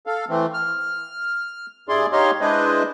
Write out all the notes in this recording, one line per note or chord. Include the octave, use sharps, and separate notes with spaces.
A4 F5
E3 A3 C4
F6
G2 E4 G#4 D5 C6
D#4 G4 C#5 D#5 F5 C6
G#3 D4 E4 B4 C5 D#5